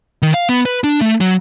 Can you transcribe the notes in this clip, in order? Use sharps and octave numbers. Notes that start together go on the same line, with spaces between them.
D#3
F5
B3
B4
D4
A3
F#3